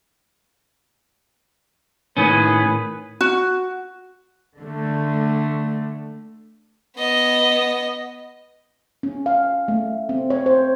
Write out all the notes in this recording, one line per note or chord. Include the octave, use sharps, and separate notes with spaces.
A2 D#3 C#4 G#4 B4
F#4
D3 A3
B3 D#5
C#4
F5
A3
C4
C#5
C5